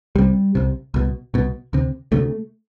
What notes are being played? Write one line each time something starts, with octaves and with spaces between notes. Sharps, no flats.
C2 C3 G3
C2 C3
C2 B2
C2 B2
D2 C3
D2 C3 A3